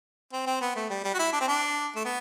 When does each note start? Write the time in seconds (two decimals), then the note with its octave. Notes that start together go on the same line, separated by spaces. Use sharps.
0.33 C4
0.46 C4
0.61 B3
0.75 A3
0.90 G3
1.04 G3
1.14 F#4
1.19 E4
1.32 D4
1.40 C4
1.48 D4
1.96 A3
2.05 B3